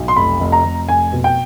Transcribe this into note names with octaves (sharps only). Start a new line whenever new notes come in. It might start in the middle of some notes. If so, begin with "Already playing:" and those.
Already playing: B1
C6
F1 B5
F1
A#5
F1
F1 G#5
B2
G5